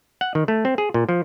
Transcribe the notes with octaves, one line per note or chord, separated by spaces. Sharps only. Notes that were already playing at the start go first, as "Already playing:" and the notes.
F#5
D#3
A3
C4
G#4
A#2
F3